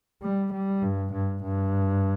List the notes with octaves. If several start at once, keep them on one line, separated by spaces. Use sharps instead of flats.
G3
G3
G2
G2
G2